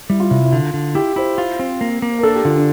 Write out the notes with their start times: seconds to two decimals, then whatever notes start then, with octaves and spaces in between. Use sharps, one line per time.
0.09 G3 E4
0.20 F4
0.30 C3 E4
0.44 E4
0.52 D3 F4
0.74 D3
0.95 E4 G4
1.16 E4 C5
1.38 F4
1.59 C4
1.81 A#3
2.02 A#3
2.19 A#4
2.23 D4 A4
2.35 G4
2.45 D3 F4
2.56 D4